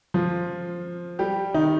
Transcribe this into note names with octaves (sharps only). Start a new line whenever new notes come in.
F3 F4
G3 G4
D#3 D#4